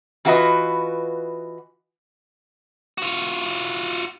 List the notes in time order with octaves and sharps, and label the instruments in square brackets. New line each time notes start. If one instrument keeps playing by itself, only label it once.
[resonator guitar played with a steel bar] E3 F4 F#4 A4 B4 D#5
[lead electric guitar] F4 F#4